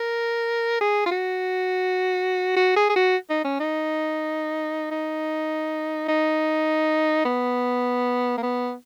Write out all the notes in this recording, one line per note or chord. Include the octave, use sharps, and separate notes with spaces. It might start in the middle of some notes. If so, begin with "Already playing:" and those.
Already playing: A#4
G#4
F4
F#4
F#4
G#4
G#4
F#4
D#4
C#4
D#4
D#4
D#4
B3
A#3
B3